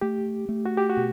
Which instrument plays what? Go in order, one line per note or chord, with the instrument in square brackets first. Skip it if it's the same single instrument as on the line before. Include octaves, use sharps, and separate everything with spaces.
[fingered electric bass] A3 [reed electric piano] G4
[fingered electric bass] A3
[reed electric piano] F#4
G4
F#4
[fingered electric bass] B2